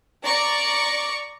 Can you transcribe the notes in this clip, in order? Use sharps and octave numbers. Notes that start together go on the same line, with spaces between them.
D5 A#5 C#6